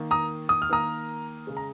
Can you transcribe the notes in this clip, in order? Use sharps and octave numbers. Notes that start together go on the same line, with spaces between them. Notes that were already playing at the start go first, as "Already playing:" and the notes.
Already playing: D#3 A#3
A#5 D#6
D#6
F6
D#3 A#3 A#5 D#6
C#3 G#3
A#5